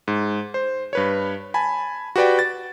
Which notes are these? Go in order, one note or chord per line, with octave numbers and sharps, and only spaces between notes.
G#2
C5
G2 B4 C#5
G#5 A5 B5
F#4 G4 B4 D5 G5
A6